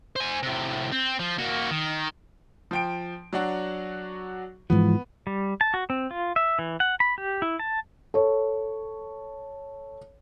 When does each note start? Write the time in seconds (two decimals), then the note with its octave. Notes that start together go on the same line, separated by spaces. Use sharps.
0.16 C5 G#5
0.43 A2 C3
0.92 C4
1.19 F3
1.38 A#3 F#4
1.70 D#3
2.71 F3 G5 D7
3.33 F#3 D4 F#4
4.70 G#2 E3 F3 B3
5.27 G3
5.61 A5
5.74 F#4
5.90 C4
6.11 F4
6.36 E5
6.59 E3
6.80 F#5
7.00 B5
7.18 G4
7.42 E4
7.60 A5
8.14 A4 C#5